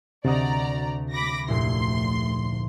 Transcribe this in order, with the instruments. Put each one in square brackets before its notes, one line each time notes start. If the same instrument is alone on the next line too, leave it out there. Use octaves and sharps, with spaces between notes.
[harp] D2 F#4 D#5 [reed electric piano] C3 [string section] D5 A#5
[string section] B5 D6 A#6
[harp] F1 A#2 E4 [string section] D2 C6